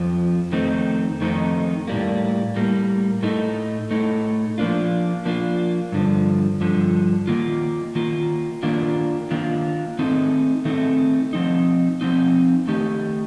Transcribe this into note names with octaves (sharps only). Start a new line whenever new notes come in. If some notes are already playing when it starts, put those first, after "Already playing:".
Already playing: F2 F3
F2 D#3 A3 C4 D#4
F2 D#3 A3 C4 D#4
A2 G3 A#3
A2 G3 A#3
A2 A3 D#4
A2 A3 D#4
F3 A#3 D4 F4
F3 A#3 D4 F4
G2 D3 F3
G2 D3 F3
D#3 A#3 F4
D#3 A#3 F4
D#3 A#3 D4 F4
D#3 A#3 D4 F4
D#3 A3 C4 D#4
D#3 A3 C4 D#4
F3 C4 D#4
F3 C4 D#4
D#3 A3 D#4 G4